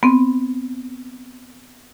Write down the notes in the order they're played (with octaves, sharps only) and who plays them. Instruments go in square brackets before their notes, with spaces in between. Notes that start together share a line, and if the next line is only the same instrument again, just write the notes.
[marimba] B3 C4